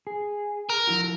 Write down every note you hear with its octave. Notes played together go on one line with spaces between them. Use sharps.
G#4
A#4
F3 E4 F#4